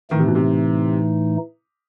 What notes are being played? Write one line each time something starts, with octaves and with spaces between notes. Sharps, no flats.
A2 D#3 E3 A3 D#4
C3
B2
C3